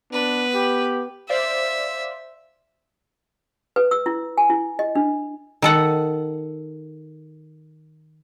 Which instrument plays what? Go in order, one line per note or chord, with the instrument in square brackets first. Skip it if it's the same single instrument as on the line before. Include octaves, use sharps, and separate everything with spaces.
[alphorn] B3 [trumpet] D4 [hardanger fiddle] B4
[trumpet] G4
[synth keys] C5 D5 F5 [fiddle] E5
[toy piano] B4
E6
E4
G#5
E4
D#5
D4
[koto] D#3 A4 F#5